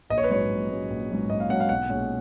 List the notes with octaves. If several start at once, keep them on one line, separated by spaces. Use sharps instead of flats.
A#1 D#5
C#5
B4
G#2 F#3 C#4 C#5
A#1
G#2 F#3 C#4
A#1
G#2 F#3 C#4
A#1 D#5
F5
G#2 F#3 C#4 F#5
F5
B1 F#5
A#2 G#3 C#4